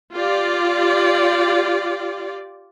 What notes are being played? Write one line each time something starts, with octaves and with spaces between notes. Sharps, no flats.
F4 G4 D5